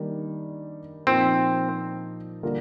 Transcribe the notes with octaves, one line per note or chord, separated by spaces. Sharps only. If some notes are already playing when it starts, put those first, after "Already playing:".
Already playing: D#3 G3 A#3 D4
A#2 F3 A#3 C4 D#4
D3 G3 A#3 F4 A#4